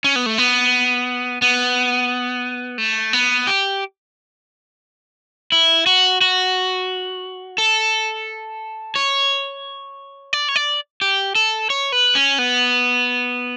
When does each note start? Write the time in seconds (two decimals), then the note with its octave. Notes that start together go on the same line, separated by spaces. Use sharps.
0.04 C#4
0.16 B3
0.26 A3
0.38 B3
1.42 B3
2.78 A3
3.13 B3
3.47 G4
5.52 E4
5.86 F#4
6.21 F#4
7.58 A4
8.95 C#5
10.33 D5
10.48 C#5
10.56 D5
11.01 G4
11.35 A4
11.70 C#5
11.92 B4
12.15 C#4
12.39 B3